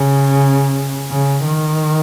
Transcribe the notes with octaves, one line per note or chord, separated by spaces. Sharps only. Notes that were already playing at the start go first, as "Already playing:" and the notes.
Already playing: C#3
C#3
D#3